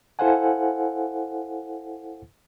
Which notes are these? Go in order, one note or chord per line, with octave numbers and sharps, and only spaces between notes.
E4 A4 C5 F5 F#5 G#5